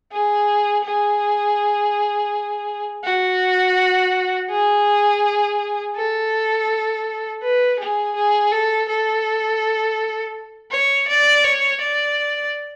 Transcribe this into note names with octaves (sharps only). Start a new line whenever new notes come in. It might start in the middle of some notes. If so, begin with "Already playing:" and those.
G#4
G#4
F#4
G#4
A4
B4
G#4
G#4
A4
A4
C#5
D5
C#5
D5